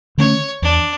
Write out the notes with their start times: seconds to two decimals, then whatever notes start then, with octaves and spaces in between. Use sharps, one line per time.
0.18 D3 A3 C#4 C#5
0.62 E2 D4